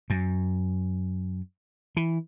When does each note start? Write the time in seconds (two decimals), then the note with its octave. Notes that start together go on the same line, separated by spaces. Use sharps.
0.10 F#2
1.97 E3